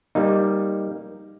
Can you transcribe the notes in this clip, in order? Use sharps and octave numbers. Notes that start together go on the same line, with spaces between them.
G3 A#3 D#4